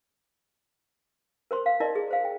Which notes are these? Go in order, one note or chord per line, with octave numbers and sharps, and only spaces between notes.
A#4 C5 C6
F5
D#4 E4 A#4 D5 D#5
G#4
C5 F5
G5